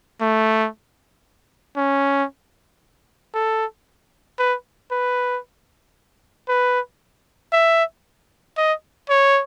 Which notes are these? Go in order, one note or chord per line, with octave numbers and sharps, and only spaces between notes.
A3
C#4
A4
B4
B4
B4
E5
D#5
C#5